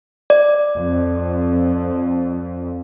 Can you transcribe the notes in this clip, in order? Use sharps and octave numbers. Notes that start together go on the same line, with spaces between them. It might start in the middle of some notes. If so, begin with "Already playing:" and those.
D5
F2